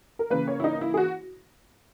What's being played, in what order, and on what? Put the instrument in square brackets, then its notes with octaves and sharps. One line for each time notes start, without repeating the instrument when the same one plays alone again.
[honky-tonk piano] A#4
C#3 E3 A#3 B4
C#5
E4
D#4
E4
G#4
F#4